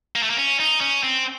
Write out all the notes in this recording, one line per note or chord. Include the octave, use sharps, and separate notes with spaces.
A#3
A3
A#3
C#4
D#4
C#4
C4